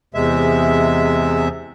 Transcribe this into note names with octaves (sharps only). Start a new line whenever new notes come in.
E2 C3 G#3 E5